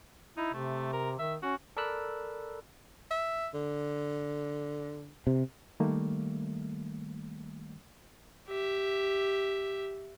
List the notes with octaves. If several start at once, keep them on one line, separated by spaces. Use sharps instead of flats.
D#4 E4
C3 A3
A#4
D#3 E5
C#4 F#4
A4 A#4 D5 B5 E6 F#6
E5
D3
C3
D#3 G3 A3 A#3
G4 E5